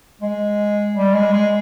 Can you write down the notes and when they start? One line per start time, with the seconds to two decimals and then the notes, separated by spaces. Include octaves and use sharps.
0.21 G#3
0.95 G3
1.14 G#3
1.33 G#3